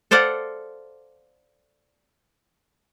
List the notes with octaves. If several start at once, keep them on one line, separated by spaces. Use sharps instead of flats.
A4 C5 D5 F5 F#5